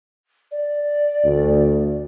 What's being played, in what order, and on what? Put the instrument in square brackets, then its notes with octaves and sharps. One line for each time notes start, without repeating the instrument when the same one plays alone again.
[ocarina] D5
[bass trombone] D2